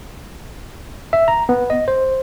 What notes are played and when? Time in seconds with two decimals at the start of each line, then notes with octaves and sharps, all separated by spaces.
1.13 E5
1.28 A#5
1.49 B3
1.70 D#5
1.88 C5